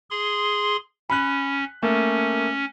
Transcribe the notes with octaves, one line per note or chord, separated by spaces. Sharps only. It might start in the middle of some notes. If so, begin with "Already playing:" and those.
G#4 C6
C#4 B5 F#6
A3 A#3 C#4